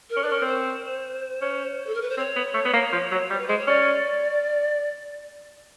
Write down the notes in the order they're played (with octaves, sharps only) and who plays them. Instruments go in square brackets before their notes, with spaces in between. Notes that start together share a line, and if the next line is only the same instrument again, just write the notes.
[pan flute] A#4
[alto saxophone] C#4
[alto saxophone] D4 [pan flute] B4
[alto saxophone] C#4 [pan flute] A#4
[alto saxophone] C4
[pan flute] C5
[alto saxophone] C#4
[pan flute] A4
A#4
B4
C5
[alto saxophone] C4 [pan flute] C#5
[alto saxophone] B3
A3
B3
A#3
F3
F#3
G3
[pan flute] B4
[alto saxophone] G#3 [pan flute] C5
[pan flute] C#5
[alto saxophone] C#4 [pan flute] D5